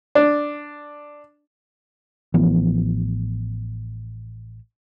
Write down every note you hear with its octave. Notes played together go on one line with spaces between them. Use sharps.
D4
A1 E3 F3 B3